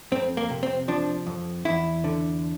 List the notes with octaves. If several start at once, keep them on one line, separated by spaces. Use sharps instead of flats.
F2 C4
A#3
C3
C4
F3 D4
F2
E2 E4
D3